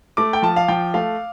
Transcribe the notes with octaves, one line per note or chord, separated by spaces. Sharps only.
A3 D6
G5
F3 A5
F5
F3 G5
A3 F5